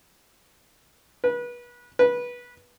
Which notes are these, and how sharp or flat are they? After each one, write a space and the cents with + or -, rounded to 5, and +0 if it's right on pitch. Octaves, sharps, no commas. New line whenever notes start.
B4 -30
B4 -20